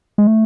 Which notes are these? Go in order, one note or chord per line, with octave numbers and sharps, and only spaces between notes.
G#3
A3